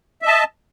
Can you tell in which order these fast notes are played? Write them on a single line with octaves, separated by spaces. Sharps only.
E5 D#5 A5